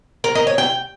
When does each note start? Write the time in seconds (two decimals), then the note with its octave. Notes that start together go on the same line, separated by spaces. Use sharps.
0.24 A#4
0.35 D#5
0.47 C#5
0.58 G5